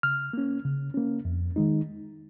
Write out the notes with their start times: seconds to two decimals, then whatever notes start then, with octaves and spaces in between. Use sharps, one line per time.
0.03 C#3 F6
0.33 A#3 C#4
0.64 C#3
0.94 A#3 C#4
1.25 F2
1.56 D#3 G#3 D#4